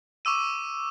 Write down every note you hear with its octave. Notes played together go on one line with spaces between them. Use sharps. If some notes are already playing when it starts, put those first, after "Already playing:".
C#6 D6 E6 D#7